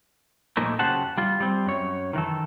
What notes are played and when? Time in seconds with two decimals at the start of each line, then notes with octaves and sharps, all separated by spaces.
0.57 A#2 F3 A3 A#3 D#4 E4
0.79 F#2 C#3 G4 C5 F#5 A5
1.18 G3 F4
1.40 G3 C4
1.66 F#2 C#5
2.13 D#3 E3 A4